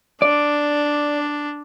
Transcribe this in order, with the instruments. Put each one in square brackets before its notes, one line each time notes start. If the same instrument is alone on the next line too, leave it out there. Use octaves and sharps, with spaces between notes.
[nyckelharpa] D4 [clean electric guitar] D5